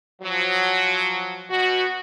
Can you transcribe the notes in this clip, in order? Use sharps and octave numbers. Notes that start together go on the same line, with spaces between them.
F3 F#3
B2 F#4